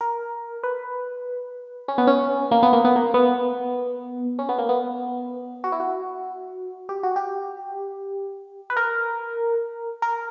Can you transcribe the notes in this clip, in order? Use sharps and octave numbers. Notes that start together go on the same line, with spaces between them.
A#4
B4
C#4
B3
C#4
A#3
B3
A#3
B3
A#3
B3
C#4
B3
A#3
B3
F#4
E4
F#4
G4
F#4
G4
B4
A#4
A#4